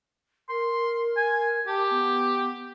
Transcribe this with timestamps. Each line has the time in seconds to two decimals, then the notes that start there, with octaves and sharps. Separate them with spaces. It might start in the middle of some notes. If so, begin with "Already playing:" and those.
0.49 A#4 C6
1.17 G#5
1.67 G4 A5
1.90 B3